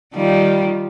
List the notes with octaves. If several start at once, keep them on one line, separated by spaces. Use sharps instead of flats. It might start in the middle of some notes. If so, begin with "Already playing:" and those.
D#3 G3 F4